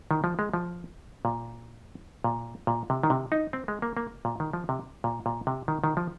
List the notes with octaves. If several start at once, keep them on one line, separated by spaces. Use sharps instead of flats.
D#3
F3
G#3
F3
A#2
A#2
A#2
C3
D#3
C3
D#4
C4
G#3
A#3
A#3
A#2
D#3
F3
C3
A#2
A#2
C3
D#3
D#3
F3